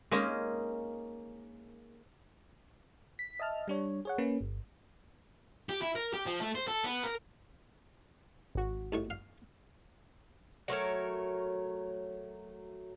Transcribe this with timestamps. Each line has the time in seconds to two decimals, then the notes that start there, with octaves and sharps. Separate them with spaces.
0.11 G#3 A#3 C#4 D#4
3.19 B6
3.40 D#5 E5 A5 F6
3.68 G3 D4 C#5
4.05 G#4 C#5 F#5
4.18 A#3 C#4 B4
4.41 G1
5.69 G4
5.82 E4
5.95 A#4
6.14 G4
6.26 F3
6.41 A3
6.55 C5
6.68 A4
6.84 B3
7.03 A#4
8.55 G#1 F#4
8.92 D#2 A2 C#6
9.10 F5
10.68 F#3 A3 A#4 C#5